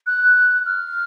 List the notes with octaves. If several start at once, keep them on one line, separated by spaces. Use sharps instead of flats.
F#6
F6